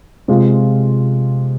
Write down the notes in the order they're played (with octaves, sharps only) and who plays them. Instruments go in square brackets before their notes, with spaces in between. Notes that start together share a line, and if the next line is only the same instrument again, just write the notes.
[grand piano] C3 G#3 F4